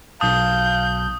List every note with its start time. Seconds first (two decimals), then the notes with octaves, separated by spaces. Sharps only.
0.21 B1 F5 A5 D#6 G6